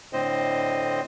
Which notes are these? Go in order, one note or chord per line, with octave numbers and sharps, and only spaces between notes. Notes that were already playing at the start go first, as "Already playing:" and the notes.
A2 D3 C4 C5 D#5